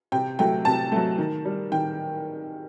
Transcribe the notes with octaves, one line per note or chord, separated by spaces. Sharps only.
C3 G5
F#3 A3 G5
C3 A5
F#3 A3
D#3
G3
D#3 G5